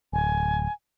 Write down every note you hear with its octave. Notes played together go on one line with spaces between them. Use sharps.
D1 G#5